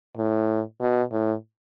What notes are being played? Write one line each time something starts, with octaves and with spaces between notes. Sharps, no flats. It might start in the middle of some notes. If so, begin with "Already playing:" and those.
A2
B2
A2